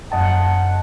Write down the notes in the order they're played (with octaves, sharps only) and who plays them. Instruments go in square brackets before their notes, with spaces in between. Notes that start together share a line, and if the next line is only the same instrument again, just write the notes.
[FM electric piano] F#2 D#5 A5 [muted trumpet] F#5